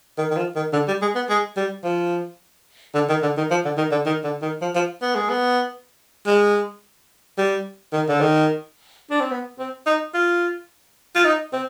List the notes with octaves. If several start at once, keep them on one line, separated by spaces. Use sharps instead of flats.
D#3
D#3
F3
D#3
D3
G3
G#3
B3
G#3
G3
F3
D3
D#3
D3
D#3
F3
D3
D#3
D3
D#3
D3
D#3
F3
F3
B3
G#3
B3
G#3
G3
D#3
D3
D#3
D4
C4
B3
C4
D#4
F4
F4
D#4
C4